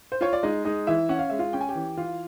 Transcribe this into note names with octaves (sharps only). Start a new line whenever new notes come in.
C5
F4 C#5
D5
G#3 D#4 D#5
G#3 D#4 D#5
E3 E4 E5
C#4 F#5
F5
G#3 E5
F4 F5
C#4 G5
G#5
G4 G5
E3
E3 F4 F5